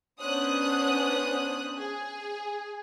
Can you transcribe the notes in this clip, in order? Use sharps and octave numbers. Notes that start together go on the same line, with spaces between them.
B3 C#4 D4 C5 D#6 F#6
G#4